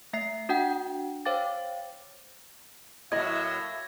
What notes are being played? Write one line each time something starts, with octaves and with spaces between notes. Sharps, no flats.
A3 E5 C7
D4 F#4 F#5 G5
C5 C#5 F5 G5 D6 A6
A2 F#3 A#3 E4 D#5 E5 G#6 A#6